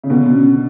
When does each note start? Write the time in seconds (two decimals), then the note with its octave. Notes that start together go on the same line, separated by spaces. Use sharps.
0.04 C#3
0.09 B2 D3 B3
0.23 B3
0.33 C#4